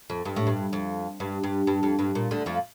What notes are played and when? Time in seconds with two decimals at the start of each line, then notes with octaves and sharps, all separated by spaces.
0.10 F2
0.25 G2
0.36 A2
0.47 G2
0.73 F2
1.20 G2
1.44 G2
1.67 G2
1.83 F2
1.99 G2
2.15 A#2
2.31 D2 D3
2.46 F2 F3